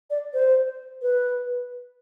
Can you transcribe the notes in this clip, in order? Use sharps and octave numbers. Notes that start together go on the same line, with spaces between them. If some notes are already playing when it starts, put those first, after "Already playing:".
D5
C5
B4